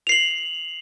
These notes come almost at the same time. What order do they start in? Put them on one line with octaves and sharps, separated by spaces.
F7 C7 F#7